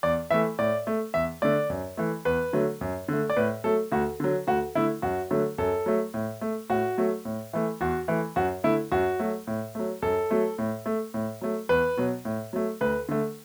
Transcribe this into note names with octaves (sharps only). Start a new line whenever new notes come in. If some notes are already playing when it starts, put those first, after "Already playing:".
E2 D5
E3 A3 E5
A2 D5
A3
E2 E5
D3 A3 D5
F#2
E3 A3
E2 B4
D3 F#3 A3
F#2
D3 A3
D5
A2 B4
F#3 A3 A4
D2 F#4
D3 F#3
D2 F#4
D3 A3 E4
F#2 F#4
D3 F#3 A3
F#2 A4
F#3 A3
A2
A3
A2 F#4
F#3 A3
A2
E3 A3
E2 F#4
E3 A3
F#2 F#4
D3 A3 E4
F#2 F#4
F#3 A3
A2
F#3 A3
F#2 A4
F#3 A3
A2
A3
A2
F#3 A3
E2 B4
B2 F#3
A2
F#3 A3
D2 B4
D3 A3